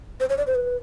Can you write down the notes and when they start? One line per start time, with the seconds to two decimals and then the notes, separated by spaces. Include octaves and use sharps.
0.20 C5
0.29 C#5
0.38 D5
0.47 C5
0.55 B4